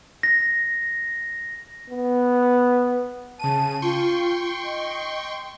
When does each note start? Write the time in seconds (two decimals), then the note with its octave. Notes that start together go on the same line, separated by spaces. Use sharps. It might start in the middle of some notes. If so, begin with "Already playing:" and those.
0.23 A#6
1.90 B3
3.39 C#3 A5 D#7
3.82 F4 G5 C6 C#6
4.64 D#5